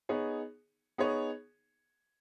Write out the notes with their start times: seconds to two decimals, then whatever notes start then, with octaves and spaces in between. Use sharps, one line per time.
0.09 B3 D#4 G#4 C#5
0.98 B3 D#4 G#4 C#5